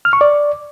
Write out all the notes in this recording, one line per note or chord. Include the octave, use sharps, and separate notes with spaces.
F6
C#6
D5